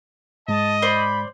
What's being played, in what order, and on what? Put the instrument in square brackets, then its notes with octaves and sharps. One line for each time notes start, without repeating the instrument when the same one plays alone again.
[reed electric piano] G#2 G#3 [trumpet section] D#5 [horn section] A5
[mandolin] C5 D5 [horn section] B5